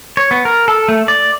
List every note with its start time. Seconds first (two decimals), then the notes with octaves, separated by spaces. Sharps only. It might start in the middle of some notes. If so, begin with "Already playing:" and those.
0.17 C#5
0.31 B3
0.45 A#4
0.68 A4
0.88 A3
1.08 D5